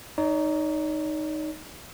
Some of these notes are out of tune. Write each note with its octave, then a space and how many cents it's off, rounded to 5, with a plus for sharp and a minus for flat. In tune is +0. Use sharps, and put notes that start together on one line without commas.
D#4 -5 C#5 +45